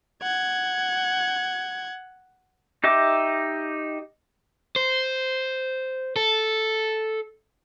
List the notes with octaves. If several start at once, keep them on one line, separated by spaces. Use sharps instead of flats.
F#5 G#6
D#4 G4 D#5 E5 D6
C5
A4